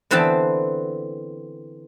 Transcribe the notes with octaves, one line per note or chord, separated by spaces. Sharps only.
D3 E3 B3 C4 G5 A5